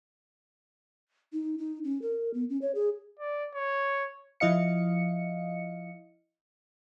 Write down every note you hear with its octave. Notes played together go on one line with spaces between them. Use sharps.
D#4
D#4
C#4
A#4
B3
C#4
C#5
G#4
D5
C#5
F3 E4 D#5 F5 C#7